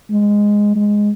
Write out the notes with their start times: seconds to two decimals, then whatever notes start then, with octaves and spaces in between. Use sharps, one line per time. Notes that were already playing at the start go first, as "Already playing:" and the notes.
0.10 G#3
0.76 G#3